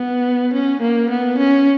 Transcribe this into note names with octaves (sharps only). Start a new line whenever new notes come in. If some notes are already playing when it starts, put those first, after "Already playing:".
Already playing: B3
C#4
A#3
B3
C#4